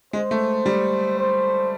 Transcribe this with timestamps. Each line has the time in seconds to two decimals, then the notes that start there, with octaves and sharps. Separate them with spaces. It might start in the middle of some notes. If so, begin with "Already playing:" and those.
0.13 G#3 C5
0.31 A3
0.66 G3
1.19 C5